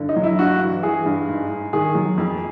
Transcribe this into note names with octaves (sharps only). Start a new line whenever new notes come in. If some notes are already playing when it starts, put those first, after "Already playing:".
Already playing: G2 D3
D#4
F#3
E4
G2 F#4
E3
E3 G#4
G2
G#2
G#2
D#3 G#4
F#3
F2